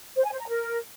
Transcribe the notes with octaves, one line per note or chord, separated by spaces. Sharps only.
C5
G#5
C5
A#5
A#4